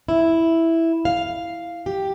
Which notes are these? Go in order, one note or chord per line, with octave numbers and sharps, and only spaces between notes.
E4
F5
G4